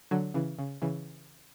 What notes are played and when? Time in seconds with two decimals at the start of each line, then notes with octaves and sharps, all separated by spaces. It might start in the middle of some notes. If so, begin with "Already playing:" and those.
0.11 D3 F#3
0.34 C#3 E3
0.59 C#3
0.82 C#3 E3